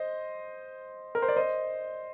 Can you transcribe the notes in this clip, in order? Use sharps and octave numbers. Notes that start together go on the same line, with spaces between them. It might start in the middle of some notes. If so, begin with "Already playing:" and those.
Already playing: C5 D#5
A#4
C5
D5
C5 D#5